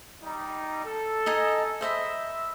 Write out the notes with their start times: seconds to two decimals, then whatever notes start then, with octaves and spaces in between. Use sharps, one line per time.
0.21 G3 D#4
0.84 A4
1.26 D#4 D#5 G#5
1.81 C5 D#5 E5 B5